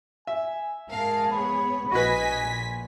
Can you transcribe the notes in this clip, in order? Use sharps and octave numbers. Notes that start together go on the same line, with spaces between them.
E5 G#5
G#2 G#4 A#4 F5 A5
B3 C#5 B5
A#1 F#4 B4 D#5 G#5 B6
A#2